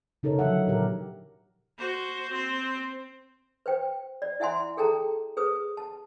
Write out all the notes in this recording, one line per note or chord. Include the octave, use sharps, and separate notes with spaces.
C#3 D#4 A4 A#4 C#5
D3 F3 F#3 D#4 E5 F#5
A#2 G4 A#4
F#4 C5
C4 C5
B4 C5 G5
D5
E4 E5 F#5 G#5 C6
G#4 A4 G5 A5 A#5
G#4 B4 D#6
A5